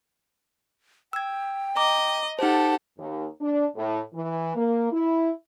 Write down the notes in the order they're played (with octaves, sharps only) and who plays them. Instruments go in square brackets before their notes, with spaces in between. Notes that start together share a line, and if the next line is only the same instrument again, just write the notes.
[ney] G5 [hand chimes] E6 G#6
[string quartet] D#5 [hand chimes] A#5 D6
[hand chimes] D#4 C5 [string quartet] G4 A4 F#5 [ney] A5
[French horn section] D#2
D4
A2
E3
A#3
E4